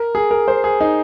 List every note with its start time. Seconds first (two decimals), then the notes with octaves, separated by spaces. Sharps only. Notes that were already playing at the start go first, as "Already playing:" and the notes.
Already playing: A#4
0.15 G#4
0.31 A#4
0.48 C5
0.64 G#4
0.81 D#4